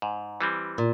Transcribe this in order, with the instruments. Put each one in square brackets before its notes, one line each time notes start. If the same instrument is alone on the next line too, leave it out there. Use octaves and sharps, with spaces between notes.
[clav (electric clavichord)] G#2
E3 G3 C4
[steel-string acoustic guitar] A#2